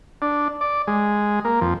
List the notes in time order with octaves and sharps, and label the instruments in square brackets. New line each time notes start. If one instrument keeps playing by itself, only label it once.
[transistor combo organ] D4
D5
G#3
A#3
F2